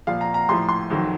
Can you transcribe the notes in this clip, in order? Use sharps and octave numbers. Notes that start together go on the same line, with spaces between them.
A#2 F3 F5
A#5
A#5
A2 F3 C6
C6
F2 D#3 F#3